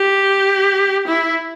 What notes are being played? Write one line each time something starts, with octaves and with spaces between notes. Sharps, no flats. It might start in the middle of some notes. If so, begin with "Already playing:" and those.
Already playing: G4
E4